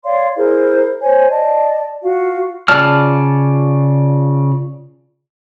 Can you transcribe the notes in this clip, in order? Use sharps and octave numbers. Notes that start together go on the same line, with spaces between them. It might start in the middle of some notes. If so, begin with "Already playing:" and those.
C#5 D5 F5 C6
E4 G#4 A#4 C5
C5 C#5 G#5
D5 D#5 A5
F4 F#4 F5
C#3 F4 D5 A5 F6